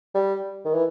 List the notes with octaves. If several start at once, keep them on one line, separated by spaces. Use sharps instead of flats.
G3
D#3
E3